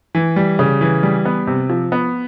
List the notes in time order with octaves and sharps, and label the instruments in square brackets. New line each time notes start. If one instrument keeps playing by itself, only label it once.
[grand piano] E3
G3
C#3
E3
G3
B3
C3
F3
B3